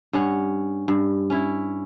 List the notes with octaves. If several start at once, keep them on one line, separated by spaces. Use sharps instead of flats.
G2 C#4 F#5
G2
C#4 E4